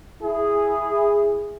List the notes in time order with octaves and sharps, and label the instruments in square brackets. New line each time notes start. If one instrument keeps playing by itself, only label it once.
[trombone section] E4 G#4